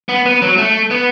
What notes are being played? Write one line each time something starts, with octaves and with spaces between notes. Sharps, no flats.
B3
B3
F#3
A3
B3